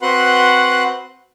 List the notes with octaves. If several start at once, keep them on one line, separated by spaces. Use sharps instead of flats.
C4 F#4 B4 F#5 C6 F#6